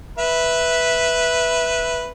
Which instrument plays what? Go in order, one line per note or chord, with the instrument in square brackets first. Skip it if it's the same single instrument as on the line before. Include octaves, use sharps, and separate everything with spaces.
[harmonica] B4 E5